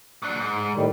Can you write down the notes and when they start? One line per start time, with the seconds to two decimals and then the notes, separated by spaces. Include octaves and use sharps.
0.22 F#3 D4
0.40 G#2
0.75 A2 D#3 G3